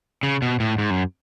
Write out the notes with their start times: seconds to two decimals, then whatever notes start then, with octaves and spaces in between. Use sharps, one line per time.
0.23 C#3
0.42 B2
0.60 A2
0.78 G#2
0.90 F#2